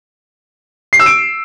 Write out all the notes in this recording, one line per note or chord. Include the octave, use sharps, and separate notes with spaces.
C7
E6
D7